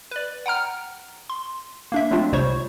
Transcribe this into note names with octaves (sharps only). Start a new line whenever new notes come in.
B4 D5
F#5 G5 A#5 F6
C6
A#3 D4 E5
F#3 G#3 A3 C4 D4 F4
C2 C3 G3 C5 C#5 C#6